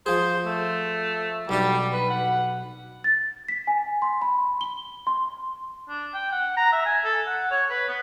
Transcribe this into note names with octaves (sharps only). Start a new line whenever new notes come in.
F3 G#4 C5
A3
B1 G3 D4 D5
B4
F#5
A6
B6
G#5
C6
B5
G7
C6
D4
G5
F#5
A#5
E5
G#5
A4
F#5
C#5
B4
B3